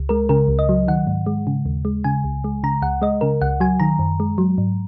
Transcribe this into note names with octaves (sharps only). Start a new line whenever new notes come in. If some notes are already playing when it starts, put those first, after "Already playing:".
Already playing: C#2
G#3 A#4
C#3 A#4
C#2
D#5
F#3
D#3 F#5
G#2
G#3
C#3
D#2
G#3
C#3 G#5
C#2
G#3
C#3 A#5
C#2 F#5
G#3 D#5
C#3 A#4
C#2 F#5
F#3 G#5
D#3 A#5
F#2
G#3
F#3
G#2